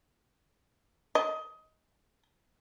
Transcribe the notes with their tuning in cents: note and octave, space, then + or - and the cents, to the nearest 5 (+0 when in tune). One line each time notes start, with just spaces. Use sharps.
D#5 +20